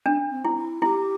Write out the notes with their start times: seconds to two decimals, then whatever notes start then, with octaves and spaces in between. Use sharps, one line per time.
0.06 D4
0.31 C4
0.45 E4
0.57 E4
0.82 E4 G4